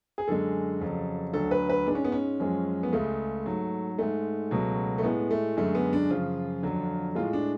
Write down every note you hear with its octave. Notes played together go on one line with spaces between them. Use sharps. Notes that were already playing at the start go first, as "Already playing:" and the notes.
G#4
F#2 D3 G#3 A4
F2 C#3 F#3
D2 D3 F#3 A4
B4
B4
G#2 G#3 D4
C#4
B3
C#4
F#2 F3 G#3
B3
C#2 C#3 G#3 A3
G#2 F#3
G#2 G#3 A3
C#2 B2 F#3
A3
A2 G#3 B3
A3
F#2 D3 G#3 A3
B3
D4
F#2 C#3 F3 F4
F2 D3 F#3
A2 G#3 F4
D4